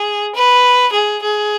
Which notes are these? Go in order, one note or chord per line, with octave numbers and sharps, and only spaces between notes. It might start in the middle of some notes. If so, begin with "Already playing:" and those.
Already playing: G#4
B4
G#4
G#4